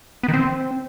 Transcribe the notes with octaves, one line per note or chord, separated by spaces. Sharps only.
B3
D#3
C4